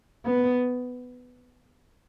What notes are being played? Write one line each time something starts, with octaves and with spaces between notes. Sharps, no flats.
B3